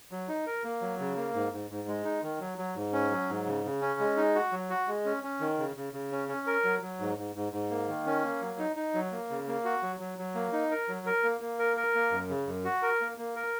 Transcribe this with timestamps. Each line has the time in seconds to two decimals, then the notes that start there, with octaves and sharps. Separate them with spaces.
0.11 F#3
0.28 D#4
0.46 A#4
0.64 A#3
0.81 F#3
0.99 C#3
1.17 A#3
1.34 G#2
1.53 G#2
1.70 G#2
1.88 G#3
2.05 D#4
2.23 D#3
2.40 F#3
2.58 F#3
2.76 G#2
2.93 C#4
3.11 F#3
3.29 G#2
3.46 C#3
3.65 C#3
3.81 C#4
4.00 G#3
4.17 D#4
4.35 F#4
4.52 F#3
4.70 F#4
4.88 G#3
5.05 C#4
5.23 C#4
5.40 D#3
5.58 C#3
5.76 C#3
5.93 C#3
6.12 C#4
6.28 C#4
6.47 A#4
6.64 F#3
6.82 F#3
7.00 G#2
7.18 G#2
7.36 G#2
7.53 G#2
7.70 A#3
7.88 D#3
8.06 C#4
8.24 A#3
8.41 F#3
8.59 D#4
8.76 D#4
8.94 F#3
9.12 A#3
9.30 C#3
9.48 A#3
9.65 F#4
9.82 F#3
10.00 F#3
10.18 F#3
10.35 A#3
10.53 D#4
10.71 A#4
10.88 F#3
11.06 A#4
11.23 A#3
11.41 A#3
11.59 A#4
11.77 A#4
11.95 A#3
12.11 F#2
12.29 C#3
12.47 F#2
12.65 F#4
12.82 A#4
13.01 A#3
13.18 A#3
13.36 A#4